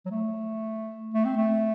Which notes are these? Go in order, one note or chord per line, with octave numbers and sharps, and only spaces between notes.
F#3
A3
A3
C4
A3